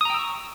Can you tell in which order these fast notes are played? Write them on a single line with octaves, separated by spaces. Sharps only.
D#6 A#5 G5 E6 C#6